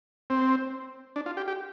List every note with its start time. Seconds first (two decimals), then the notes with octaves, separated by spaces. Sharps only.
0.30 C4
1.16 D4
1.26 F4
1.37 G4
1.48 G4